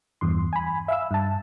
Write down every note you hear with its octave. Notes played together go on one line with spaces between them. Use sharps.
E2 G2 C6
G#5 B5
E5 F5 E6
G2 A5